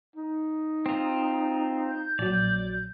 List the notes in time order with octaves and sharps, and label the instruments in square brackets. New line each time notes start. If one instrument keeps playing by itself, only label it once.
[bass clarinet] D#4
[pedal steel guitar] C4 F4
[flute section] G6
[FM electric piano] A#1 F#3 [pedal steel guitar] D5